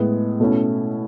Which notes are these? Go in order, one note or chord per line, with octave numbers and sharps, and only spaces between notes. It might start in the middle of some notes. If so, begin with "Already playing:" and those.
Already playing: A2 G#3 B3
B2 A3 C#4 E4